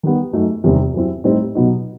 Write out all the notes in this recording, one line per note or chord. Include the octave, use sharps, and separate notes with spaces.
D#3 G3 B3
F#2 F#3 A3 D#4
E2 C3 D#3 G3 C4
F#2 F#3 C4 E4
A2 G3 C4 D#4
B2 F#3 B3 D#4